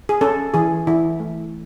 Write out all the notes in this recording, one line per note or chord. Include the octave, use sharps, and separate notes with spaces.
G#4
C#4 A4
E3 G#4
E3 E4
A3